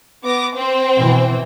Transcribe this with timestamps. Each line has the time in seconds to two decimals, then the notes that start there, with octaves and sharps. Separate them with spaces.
0.24 B3 D6 A#6
0.56 C4 C5 G5
0.97 B2 E3